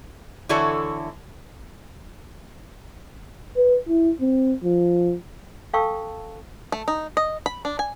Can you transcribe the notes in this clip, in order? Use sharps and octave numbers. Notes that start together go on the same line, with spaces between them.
D3 E3 E4 F#4 A4 C#5
B4
E4
C4
F3
A4 F5 G5 A5 C#6 E6
A3
D#4
D#5
B5
D4
G#5